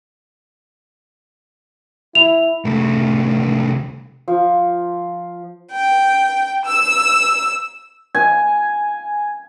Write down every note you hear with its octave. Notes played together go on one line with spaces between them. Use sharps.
E4 F7
C2 A3
F3
G5
E6
G#5